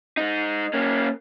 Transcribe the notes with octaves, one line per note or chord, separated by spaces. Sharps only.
G#3 D#4
A#3 C#4